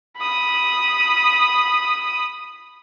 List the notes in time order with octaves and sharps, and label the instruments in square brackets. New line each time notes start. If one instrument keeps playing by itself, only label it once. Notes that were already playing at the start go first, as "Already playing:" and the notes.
[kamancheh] B5 D#6